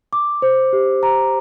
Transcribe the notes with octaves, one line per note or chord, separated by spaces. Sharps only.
D6
C5
G4
A#5